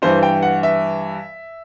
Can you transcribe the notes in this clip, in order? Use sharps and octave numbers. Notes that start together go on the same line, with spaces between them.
G2 E3 C5
G5
F#5
E5